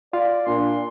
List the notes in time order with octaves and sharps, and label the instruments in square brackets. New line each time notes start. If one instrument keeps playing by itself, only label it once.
[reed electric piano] F4 F5 [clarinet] D5
[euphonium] A#2 [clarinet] D4 [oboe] C6